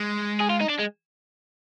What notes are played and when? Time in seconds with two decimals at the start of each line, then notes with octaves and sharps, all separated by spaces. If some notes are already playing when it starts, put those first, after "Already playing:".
Already playing: G#3
0.41 G#4
0.50 F4
0.60 D#4
0.69 D4
0.78 G#3